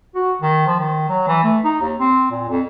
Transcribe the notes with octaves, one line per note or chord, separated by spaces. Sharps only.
F#4
D#3
F3
D#3
F#3
E3
A3
D#4
D#2
C4
A#2
F2